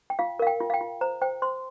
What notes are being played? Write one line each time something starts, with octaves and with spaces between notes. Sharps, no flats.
G5
F4 F5
A#4 F5
G5
F4
F5
G5
F4
C5 A#5
C5 G5
C5 C6